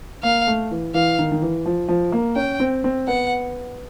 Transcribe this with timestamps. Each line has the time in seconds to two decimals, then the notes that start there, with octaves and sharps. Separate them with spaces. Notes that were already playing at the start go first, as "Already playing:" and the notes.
0.23 A#3 F5
0.47 A3
0.71 E3
0.94 E3 F5
1.19 D#3
1.32 D#3
1.42 E3
1.66 F3
1.88 F3
2.12 A#3
2.36 C#4 G5
2.60 C4
2.84 C4
3.08 B3 F#5